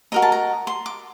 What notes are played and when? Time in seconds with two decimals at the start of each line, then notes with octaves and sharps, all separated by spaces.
0.12 F#4 A#4 D#5 A#5
0.22 A5
0.32 A#5
0.67 C6
0.86 D6